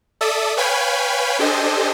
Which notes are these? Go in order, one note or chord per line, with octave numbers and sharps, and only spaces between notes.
A4 D5 E5 D#6
B4 C#5 F5 G5 G#5 B5
D4 G4 A4 C5 D#5 G#5